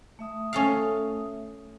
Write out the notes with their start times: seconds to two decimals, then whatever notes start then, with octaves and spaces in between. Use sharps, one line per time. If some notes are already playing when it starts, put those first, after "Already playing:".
0.19 A3 E5 D#6
0.53 C#4 A4 F5